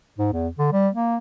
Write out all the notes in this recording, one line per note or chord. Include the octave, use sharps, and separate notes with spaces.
G#2
E2
D3
G3
A#3